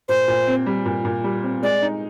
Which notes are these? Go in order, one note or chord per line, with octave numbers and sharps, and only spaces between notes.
A#2 C5
A#2
C4
G3
A#2
A#2
G3
C4
G#3 D5
D#4